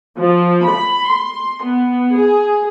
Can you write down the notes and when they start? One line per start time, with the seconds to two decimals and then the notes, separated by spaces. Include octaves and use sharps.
0.21 F3
0.67 B5
1.12 C6
1.63 B3
2.15 G#4